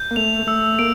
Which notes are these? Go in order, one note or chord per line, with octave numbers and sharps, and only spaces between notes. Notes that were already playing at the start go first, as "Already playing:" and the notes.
Already playing: G6
A#3
A3 F7
A3 E6
A#3 D7